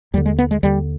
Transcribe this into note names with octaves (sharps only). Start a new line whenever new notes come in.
D#2 D3 G3
G#3
B3
G#3
D#2 D3 G3